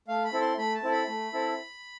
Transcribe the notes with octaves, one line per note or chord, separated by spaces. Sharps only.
A3 F5
B5
C4 E4 A4
C6
A3 B5
A5
C4 E4 A4
B5
A3
C4 E4 A4